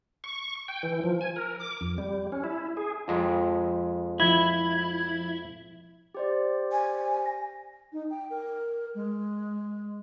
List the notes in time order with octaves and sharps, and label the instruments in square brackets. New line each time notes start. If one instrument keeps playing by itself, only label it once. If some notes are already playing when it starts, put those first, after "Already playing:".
[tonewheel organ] C#6
G5
E3
F3
G#5
A#4
D6
F2
G3
C#4
E4
G#4
[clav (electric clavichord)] F2 G#3
[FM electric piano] F3 G#6 [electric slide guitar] E4
[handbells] G4 C5 D5
[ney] G#5
[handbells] A#6
[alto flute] D#4
G5
A#4
G#3